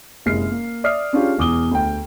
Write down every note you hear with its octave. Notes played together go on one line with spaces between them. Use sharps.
F#1 C3 G#3 E4 F6 C7
A#3
D5 E5 D#6 F6 C7
C#4 D4 F4 G4 G#4
E1 E2 D6 D#6 G7
D2 G5